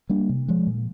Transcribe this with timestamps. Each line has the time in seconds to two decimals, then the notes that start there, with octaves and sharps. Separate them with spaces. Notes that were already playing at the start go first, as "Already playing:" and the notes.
0.09 G3 A#3 D4
0.29 C3
0.48 F3 G#3
0.67 A#2